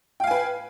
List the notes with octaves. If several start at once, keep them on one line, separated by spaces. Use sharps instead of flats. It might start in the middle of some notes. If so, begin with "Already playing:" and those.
B4 F5 G5 G#5